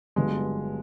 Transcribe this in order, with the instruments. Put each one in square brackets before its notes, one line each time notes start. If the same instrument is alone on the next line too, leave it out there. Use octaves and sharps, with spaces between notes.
[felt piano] G1 G2 D3 F#3 B3 [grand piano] G#3